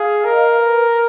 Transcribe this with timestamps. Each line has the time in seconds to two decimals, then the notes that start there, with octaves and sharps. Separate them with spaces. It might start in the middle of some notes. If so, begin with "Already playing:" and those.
Already playing: G#4 F5
0.24 A#4 D#5
0.56 B4